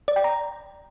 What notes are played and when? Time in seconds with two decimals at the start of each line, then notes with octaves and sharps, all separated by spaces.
0.08 D5
0.16 G5
0.24 A#5